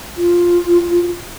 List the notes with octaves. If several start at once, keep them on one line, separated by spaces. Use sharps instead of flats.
F4